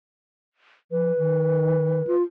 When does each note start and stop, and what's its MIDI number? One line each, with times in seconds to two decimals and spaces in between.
0.91 1.12 53
0.91 2.15 71
1.18 2.02 51
2.07 2.22 65